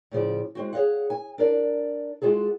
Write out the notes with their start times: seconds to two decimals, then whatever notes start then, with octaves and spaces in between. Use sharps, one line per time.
0.12 A2 C#3 F3 D5
0.55 G#3 C4 F#4
0.73 G#4 C#5 D#5 F5 F#5
1.10 G#5
1.38 D4 A#4 D5
2.22 G#3 F4 F#4 G#4 A4